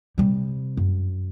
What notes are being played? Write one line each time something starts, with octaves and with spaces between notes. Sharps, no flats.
C3 G3
F#2